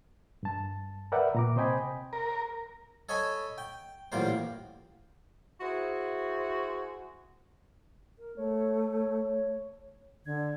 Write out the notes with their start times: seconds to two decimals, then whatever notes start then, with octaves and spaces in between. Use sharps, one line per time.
0.43 G2 A5
1.12 A#4 B4 D5 E5 F#5 G5
1.35 A#2 A#5 D6
1.56 C3 C5 D#5 G5 G#5 B5
2.13 A#4
3.09 A4 C#5 D#5 G#5 B5
3.58 G5
4.12 A1 F#2 A#2 G3 A#4 C5
5.61 E4 F#4 G#4 C5
8.19 A#4
8.37 A3 C#5
10.26 D3 G#6